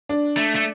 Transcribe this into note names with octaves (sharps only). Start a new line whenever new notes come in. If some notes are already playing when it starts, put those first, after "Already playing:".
D4
A3
A3